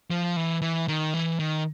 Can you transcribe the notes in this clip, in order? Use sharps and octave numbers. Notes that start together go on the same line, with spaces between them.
F3
E3
E3
D#3
E3
D#3